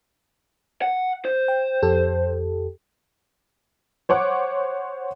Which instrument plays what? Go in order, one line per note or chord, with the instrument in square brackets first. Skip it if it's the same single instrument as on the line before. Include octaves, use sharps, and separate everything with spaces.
[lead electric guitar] F#5
C5
[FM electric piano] G5
F2 G4 A4
[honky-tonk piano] C5 C#5 F#5 D6